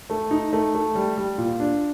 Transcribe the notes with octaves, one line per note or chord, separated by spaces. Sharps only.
A3
D#4
A3
A3
G3
G3
A#2
D4